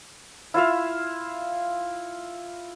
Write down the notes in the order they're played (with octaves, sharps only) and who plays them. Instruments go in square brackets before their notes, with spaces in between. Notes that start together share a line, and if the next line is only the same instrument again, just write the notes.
[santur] E4 F4 E5 F5